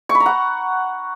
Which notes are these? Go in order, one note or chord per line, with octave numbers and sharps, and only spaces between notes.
C#6
B5
A#5
F#5